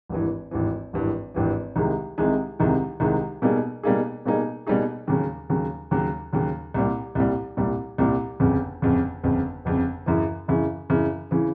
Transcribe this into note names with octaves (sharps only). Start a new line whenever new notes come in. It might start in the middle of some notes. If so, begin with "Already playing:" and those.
G#1 G2 E3
G#1 G2 E3
G#1 G2 E3
G#1 G2 E3
C2 C3 D#3 G#3
C2 C3 D#3 G#3
C2 C3 D#3 G#3
C2 C3 D#3 G#3
B2 G3 A#3 D#4 G#4
B2 G3 A#3 D#4 G#4
B2 G3 A#3 D#4 G#4
B2 G3 A#3 D#4 G#4
D#2 C#3 F#3
D#2 C#3 F#3
D#2 C#3 F#3
D#2 C#3 F#3
C2 A#2 G3
C2 A#2 G3
C2 A#2 G3
C2 A#2 G3
G1 F2 C#3
G1 F2 C#3
G1 F2 C#3
G1 F2 C#3
F#2 C#3 E3
F#2 C#3 E3
F#2 C#3 E3
C#3 E3